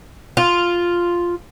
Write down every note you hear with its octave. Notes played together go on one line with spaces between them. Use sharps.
F4